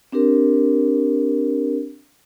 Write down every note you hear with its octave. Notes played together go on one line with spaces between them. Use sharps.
C4 D4 G4 A#4